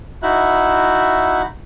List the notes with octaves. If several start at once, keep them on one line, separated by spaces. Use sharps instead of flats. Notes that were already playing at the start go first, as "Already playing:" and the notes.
D#4 E4 F#4 E5 F#6